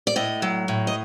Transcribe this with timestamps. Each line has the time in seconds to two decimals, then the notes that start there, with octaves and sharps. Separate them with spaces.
0.07 D5
0.16 A2 D#5
0.42 F#3
0.68 A2
0.87 D#5